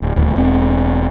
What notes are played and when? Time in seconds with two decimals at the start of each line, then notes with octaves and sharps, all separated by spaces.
0.02 D1
0.16 D#1 D2 D3 A3
0.36 E1 C4